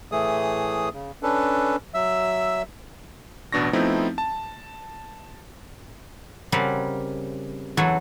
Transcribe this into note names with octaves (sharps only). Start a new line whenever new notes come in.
A2 E3 A3 G#4 D#6
C#3
C#4 D4 A4 B4
F#3 E5 E6
A1 B2 D4 C#6 A#6
F3 A3 B3 C4 D#4 E4
A5
C#3 G3 C4 A#4 F5 F#5
E2 F#3 F#4 A4 F#5 G#5